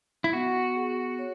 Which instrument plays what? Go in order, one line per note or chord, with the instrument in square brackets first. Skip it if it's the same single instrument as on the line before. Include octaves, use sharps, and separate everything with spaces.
[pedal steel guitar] E4
[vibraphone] B3 [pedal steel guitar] F#4
[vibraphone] G#4
C#5